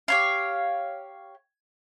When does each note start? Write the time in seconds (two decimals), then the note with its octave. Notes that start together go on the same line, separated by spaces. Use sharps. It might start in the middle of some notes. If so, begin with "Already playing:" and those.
0.08 G4 C#5 F5